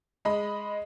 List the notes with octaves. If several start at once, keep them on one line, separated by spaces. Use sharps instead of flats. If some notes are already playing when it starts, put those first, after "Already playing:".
G#3 D#5 B5